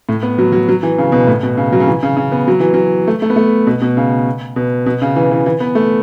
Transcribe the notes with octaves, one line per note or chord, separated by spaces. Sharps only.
A2
B3
F#3
F#3
F#3
E3
C#3
B2
A2
B2
C#3
F#3
C#3
E3
C#3
C#3
B3
F#3
E3
F#3
A3
A3
B3
A3
B2
B2
C#3
B2
B2
C#3
E3
E3
E3
B3
A3